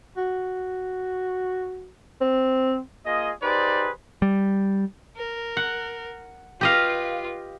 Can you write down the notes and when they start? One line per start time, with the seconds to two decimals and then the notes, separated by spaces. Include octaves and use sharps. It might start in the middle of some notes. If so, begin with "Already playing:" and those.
0.17 F#4
2.21 C4
3.06 A#3 F4 G#4 D#5
3.43 D#4 G4 G#4 B4 C5 D5
4.22 G3
5.17 A#4
5.57 F#5
6.61 F4 G4 B4 D#5 F5